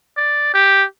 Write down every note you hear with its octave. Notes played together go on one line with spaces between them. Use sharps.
D5
G4